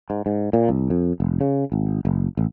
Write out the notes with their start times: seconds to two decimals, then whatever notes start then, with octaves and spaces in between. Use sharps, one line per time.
0.10 G#2
0.26 G#2
0.53 A#2
0.69 C2
0.90 F2
1.20 F1
1.41 C#3
1.72 G#1
2.05 F#1
2.37 A1